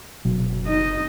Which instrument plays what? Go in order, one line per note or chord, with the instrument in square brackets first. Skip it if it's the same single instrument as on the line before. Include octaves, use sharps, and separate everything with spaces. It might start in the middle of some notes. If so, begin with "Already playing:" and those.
[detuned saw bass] F#1 [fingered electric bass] B2 F#3
[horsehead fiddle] D#4 D#5